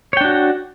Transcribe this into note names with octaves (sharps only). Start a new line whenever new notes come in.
D4 F#4 C#5 G5